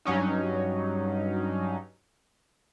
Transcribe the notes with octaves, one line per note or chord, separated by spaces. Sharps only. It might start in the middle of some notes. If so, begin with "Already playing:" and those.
G2 F#3 C#4 D#4